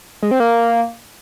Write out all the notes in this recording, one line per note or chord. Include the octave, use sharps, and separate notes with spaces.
G#3
C4
A#3